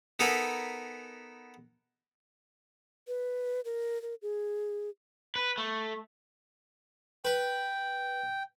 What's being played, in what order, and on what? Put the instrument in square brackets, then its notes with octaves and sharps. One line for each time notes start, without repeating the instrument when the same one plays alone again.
[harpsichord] B3 D#4 A4 A#4 G#5 B5
[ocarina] B4
A#4
A#4
G#4
[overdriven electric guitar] B4
A3
[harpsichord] B4 [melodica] G5